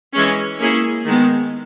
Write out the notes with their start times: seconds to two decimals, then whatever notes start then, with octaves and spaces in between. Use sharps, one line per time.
0.13 E3 G#3 C#4
0.58 A#3 C#4 E4 G#4
1.05 D#3 G#3 B3